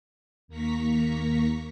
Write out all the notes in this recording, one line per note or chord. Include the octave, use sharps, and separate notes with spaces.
D#2 A#3 A#5 C#6 B6